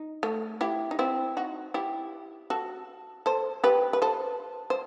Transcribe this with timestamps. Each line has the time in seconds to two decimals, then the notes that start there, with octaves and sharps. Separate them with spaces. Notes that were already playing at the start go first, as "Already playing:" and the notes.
Already playing: D#4
0.23 A3
0.61 E4 G4
0.91 D#4
0.99 C4 E4
1.37 D#4 F#4
1.74 E4 G4
2.50 F#4 A4
3.26 A4 C5
3.64 G4 B4
3.93 B4
4.02 A4 C5
4.70 C5